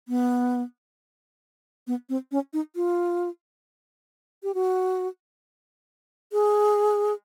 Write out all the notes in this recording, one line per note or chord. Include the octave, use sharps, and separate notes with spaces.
B3
B3
C4
C#4
D#4
F4
G4
F#4
G#4